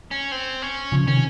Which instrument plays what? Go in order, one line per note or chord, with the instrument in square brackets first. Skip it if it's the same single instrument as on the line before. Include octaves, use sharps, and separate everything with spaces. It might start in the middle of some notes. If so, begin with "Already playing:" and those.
[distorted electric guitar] C#4
C4
C#4
[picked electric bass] C#3 F3
[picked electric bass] C3 D#3 [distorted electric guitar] C#4